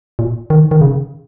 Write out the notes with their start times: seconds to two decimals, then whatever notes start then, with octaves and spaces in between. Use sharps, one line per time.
0.19 A#2
0.50 D#3
0.71 D#3
0.81 C#3